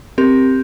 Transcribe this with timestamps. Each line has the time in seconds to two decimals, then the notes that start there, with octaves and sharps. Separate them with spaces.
0.18 C4 G4 A#4